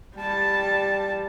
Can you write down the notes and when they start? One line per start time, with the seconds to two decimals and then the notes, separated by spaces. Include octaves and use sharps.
0.16 G3 A5